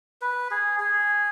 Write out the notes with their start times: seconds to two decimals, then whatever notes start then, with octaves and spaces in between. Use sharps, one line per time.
0.22 B4
0.51 G#4
0.80 G#4